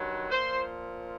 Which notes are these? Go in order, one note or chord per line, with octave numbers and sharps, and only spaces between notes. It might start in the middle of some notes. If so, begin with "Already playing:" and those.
Already playing: G2 D#3 F#3
A#2 F3 C5